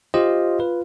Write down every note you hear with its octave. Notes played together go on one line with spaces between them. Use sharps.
F4 G4 C5 D#5
B4